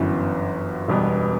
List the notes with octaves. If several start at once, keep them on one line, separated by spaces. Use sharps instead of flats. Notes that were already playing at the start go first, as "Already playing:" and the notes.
Already playing: G1 F#2 E3 B3
E1 E2 B2 G3 B3